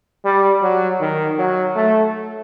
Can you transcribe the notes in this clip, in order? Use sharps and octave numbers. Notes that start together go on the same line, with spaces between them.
G3
F#3
D#3
F#3
A3